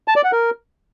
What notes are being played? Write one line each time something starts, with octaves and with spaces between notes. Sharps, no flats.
A5
D5
F#5
A#4